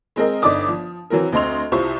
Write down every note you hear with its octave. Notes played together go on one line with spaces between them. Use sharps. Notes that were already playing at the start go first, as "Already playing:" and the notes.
G#3 C4 A#4 D#5
G1 D3 D#4 D5 D6 D#6
F3
E3 F#3 C4 A#4
D2 C4 D#5 C6 F7
C2 C3 E4 F4 C5 C#6